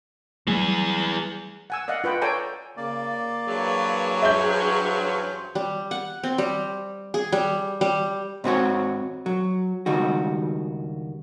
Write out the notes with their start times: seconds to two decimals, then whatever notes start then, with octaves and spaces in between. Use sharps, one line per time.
0.47 E3 F#3 G3 A3 G#4
1.70 F#5 G#5 E6
1.88 D5 D#5 F5 F#5
2.04 F4 B4 F#5 G5
2.21 A4 C#5 D5 G5 G#5 A#5
2.77 C#3 A#3 D5
3.47 G2 E3 F#3 G#4
4.22 C#4 C5 E5 G6
5.55 G3
5.91 F#5
6.24 C4
6.38 G3
7.14 G#4
7.32 G3
7.81 G3
8.44 G#2 C4 F#4 C#5
9.26 F#3
9.86 C#2 D#3 G3 F#4